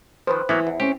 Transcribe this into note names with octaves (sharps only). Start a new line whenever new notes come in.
D#3 F3 B4 C5
E3 F#3 A#3 B3
E2
C4 C#4 G4